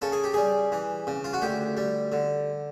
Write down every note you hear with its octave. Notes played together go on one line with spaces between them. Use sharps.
C#3 A4
G#4
G4
G3 G#4
E3
C#3
F4
F#4
D2 G4
G3
D3